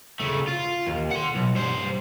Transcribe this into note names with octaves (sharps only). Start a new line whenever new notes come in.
C#3 A3
F4
D#2
F#5 C6
B1
G2 C5